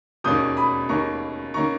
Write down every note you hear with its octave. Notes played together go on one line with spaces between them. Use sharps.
E1 D#2 D#3 A#3 C#4 D#6 G6
B5 D#6
E1 D#2 D#3 A#3 C#4 A#5 C#6
D#3 A#3 C#4 A#5 C#6